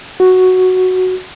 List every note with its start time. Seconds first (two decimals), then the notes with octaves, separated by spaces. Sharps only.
0.20 F#4